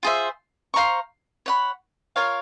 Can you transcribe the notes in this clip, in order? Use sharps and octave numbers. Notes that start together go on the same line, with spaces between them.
F4 G#4 C5 E5
C5 F5 A#5 C#6
C#5 F#5 B5
F4 A#4 C#5 F5